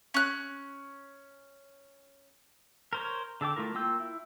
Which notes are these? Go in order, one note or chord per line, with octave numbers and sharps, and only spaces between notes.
C#4 F#6
A#4 C5 C#5
D3 A4 G5 D6
A3 E4 F4 A#4
A#3 F4 G5 E6 G6
E4